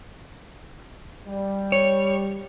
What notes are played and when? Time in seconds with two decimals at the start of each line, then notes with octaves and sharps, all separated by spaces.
1.27 G3
1.72 C#5